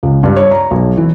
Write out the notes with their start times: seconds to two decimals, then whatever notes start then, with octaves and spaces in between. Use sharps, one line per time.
0.03 C#2
0.23 G2
0.36 C#5
0.51 A#5
0.71 B1
0.97 E3